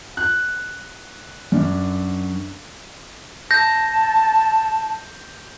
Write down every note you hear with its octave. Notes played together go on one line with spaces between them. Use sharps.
F#6
F#2 D4
A5 G6 A#6